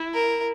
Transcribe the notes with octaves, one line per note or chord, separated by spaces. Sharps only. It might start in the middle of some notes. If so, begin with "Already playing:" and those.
Already playing: E4
A#4